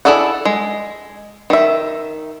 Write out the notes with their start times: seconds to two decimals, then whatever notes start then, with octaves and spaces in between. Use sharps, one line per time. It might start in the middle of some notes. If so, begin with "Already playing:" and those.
0.05 E4 G#4 A4 D5 F#5
0.45 G#3
1.50 D#3 E5